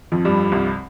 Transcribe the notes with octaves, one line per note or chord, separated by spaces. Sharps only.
F2 F3
G2 G3
C2 C3